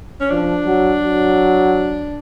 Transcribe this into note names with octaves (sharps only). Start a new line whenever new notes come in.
C#4
F3 D4
F#3
F#3